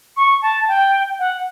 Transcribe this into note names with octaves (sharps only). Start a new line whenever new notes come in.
C#6
A5
G5
F#5